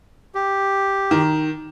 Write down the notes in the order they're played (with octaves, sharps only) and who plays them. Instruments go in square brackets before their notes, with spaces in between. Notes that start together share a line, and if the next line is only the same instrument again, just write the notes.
[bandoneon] G4
[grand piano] D#3